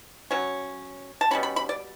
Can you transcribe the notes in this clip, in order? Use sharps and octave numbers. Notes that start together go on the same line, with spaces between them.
F#3 C#4
A5
B2 G3 C#4 B5
B5
B5
D5